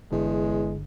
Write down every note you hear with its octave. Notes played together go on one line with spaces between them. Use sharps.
G1 E2 D3 G#3